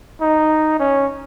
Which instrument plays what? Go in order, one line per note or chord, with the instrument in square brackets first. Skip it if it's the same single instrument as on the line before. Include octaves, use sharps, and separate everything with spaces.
[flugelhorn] D#4
C#4